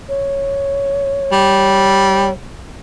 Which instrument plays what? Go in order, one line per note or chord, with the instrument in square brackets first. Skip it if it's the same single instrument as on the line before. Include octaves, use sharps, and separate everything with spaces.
[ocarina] C#5
[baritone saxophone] G3